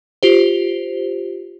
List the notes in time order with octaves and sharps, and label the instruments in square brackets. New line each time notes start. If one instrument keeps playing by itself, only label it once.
[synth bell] F4 G4 C5